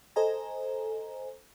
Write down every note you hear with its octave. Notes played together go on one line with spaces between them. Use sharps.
A4 C5 D#5 G#5 A#5